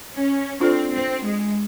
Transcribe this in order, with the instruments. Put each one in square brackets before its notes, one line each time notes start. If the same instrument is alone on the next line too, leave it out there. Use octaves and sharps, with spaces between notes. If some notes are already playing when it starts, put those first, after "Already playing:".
[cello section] C#4
[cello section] C4 [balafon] D4 F4 A4 D5
[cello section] C4
G#3